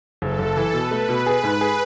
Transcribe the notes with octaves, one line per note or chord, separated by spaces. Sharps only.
F#1 A4
F#1
E3
B2 B4
A3
B2
G#4 B4
G#2
G#4